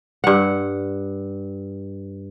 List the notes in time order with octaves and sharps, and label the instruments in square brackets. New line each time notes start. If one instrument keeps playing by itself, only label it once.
[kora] G2 F#5